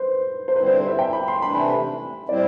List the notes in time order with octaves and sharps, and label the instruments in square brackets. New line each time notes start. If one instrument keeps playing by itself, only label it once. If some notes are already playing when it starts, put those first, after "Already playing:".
Already playing: [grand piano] B4 C5
C5
[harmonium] D3 G3 C4 E4 [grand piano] B4
[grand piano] C5
C5
E5
G5
B5
C6
[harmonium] C3 E3 A3 D4 [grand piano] B5
[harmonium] A2 G3 C4 E4 [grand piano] D5